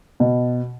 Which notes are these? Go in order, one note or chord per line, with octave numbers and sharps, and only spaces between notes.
B2